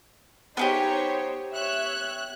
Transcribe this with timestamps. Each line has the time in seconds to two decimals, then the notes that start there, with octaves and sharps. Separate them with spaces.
0.57 B3 D4 D#4 G4 C5 C#5
1.55 C#5 E5 F#6